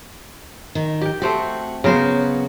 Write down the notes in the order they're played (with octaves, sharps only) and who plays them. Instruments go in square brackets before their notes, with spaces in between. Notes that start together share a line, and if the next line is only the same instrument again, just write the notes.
[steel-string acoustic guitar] D#3
[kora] G4 G5
[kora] A3 C4 G4 [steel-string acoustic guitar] F#4
[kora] C#3 A#4 C5 [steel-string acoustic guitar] F#3 B3 F#4